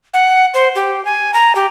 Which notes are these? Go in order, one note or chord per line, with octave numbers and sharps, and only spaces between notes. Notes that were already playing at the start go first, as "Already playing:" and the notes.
F#5
C5
G4
G#5
A#5
G4